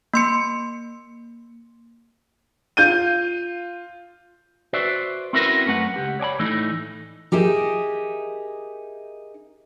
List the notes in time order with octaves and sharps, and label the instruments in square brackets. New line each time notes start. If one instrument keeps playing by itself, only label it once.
[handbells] A#3 C6 C#7
[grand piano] F4 G6 D#7
[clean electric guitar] F#4 B4 C5 D5 E5
C4 C#4 E4 F#4 A#4 B4
F#2 A3 B4 F#5
C#2 G4 F#5
C#5 D5 G#5 B5
A2 E3 A3 D#4
[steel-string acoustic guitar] D#4 G4 G#4 A#4 E5